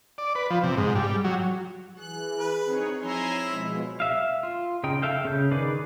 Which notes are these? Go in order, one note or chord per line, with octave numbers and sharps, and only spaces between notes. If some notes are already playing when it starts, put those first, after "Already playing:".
D5
B4
F3
C3
G#2
G3
F#3
E3 G#4 F#6
B4
D#3 C4 D#4 G#4 C#5
F3 D#4 E4 C#5 G#5 A#5 C6
B2 F3 G#3 D#4 C5 C#5
E5 F5
F4
C#3 D#4 G5
A4 E5 F5 G5
C#3 G6
D#3 G#4 B4 D5